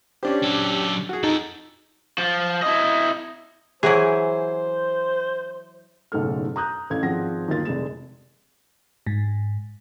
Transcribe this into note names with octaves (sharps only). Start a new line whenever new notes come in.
C#4 D4 G4 C5
F#3 A4
F#4 G#4
F2 D#4 A4
F3
E4 D#5
E3 F#3 E4 G#4 A#4 C5
F#1 B1 G#2 A3 A4 F6
A#5 D#6 F#6 G6
A1 A4 F5 G#6
G#1 F3 C4 G#4 F#5 A#6
G1 D#2 D#3 A#3 F4 A6
F1 C2 G#3 E7
G#2